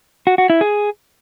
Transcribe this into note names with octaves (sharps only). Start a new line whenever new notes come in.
F#4
F#4
E4
G#4